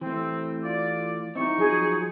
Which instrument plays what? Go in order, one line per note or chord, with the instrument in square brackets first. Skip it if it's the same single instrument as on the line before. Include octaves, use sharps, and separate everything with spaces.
[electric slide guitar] E3 A3 [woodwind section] C4
[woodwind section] F4 D5
[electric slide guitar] C4 E4 G4 [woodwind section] D#4 C#6
[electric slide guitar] F3 F#3 [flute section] G#4